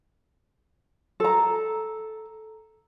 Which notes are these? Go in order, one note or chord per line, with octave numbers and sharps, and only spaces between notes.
A4 A#5